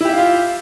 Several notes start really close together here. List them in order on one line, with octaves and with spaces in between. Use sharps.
E4 G4 E5 F5 F4